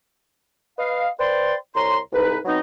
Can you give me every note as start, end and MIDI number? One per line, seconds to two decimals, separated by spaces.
0.78 1.08 71
0.78 1.08 75
0.78 1.08 77
1.18 1.54 71
1.18 1.54 72
1.18 1.54 74
1.18 1.54 79
1.18 1.54 84
1.75 1.98 36
1.75 1.98 73
1.75 1.98 82
1.75 1.98 84
2.12 2.38 36
2.12 2.38 44
2.12 2.38 63
2.12 2.38 71
2.45 2.59 54
2.45 2.59 59
2.45 2.59 60
2.45 2.59 63